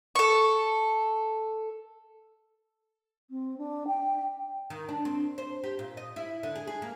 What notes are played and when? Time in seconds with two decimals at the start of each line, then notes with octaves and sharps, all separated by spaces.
0.15 A4 C#6
3.30 C4
3.57 D4
3.87 G5
4.70 D#3
4.89 D4
5.05 C4
5.38 C5
5.64 G4
5.79 A#2
5.97 D#5
6.16 E4
6.43 D3
6.55 G#4
6.67 G#4
6.82 A#3